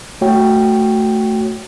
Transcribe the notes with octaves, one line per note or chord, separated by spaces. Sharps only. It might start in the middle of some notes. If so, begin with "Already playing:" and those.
A3 F#4 C#5 G5